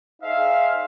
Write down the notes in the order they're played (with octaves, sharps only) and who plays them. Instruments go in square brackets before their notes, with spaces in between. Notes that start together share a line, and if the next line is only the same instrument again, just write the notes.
[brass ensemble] D#4 G#4 C5 E5 F5